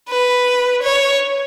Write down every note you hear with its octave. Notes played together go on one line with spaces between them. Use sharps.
B4
C#5